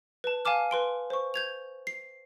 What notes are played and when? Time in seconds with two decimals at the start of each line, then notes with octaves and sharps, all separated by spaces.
0.24 B4 A5
0.45 F5 G#5 A5 D6 F6
0.71 B4 C6 D7
1.10 C5 C#6
1.34 G6 G#6 F7
1.87 C7